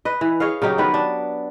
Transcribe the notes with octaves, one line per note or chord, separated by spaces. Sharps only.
B4 D#5
E3
G#4 C#5 D#5 F5
C#3 F#3 D#4 G4
D#3 B3 B4
D4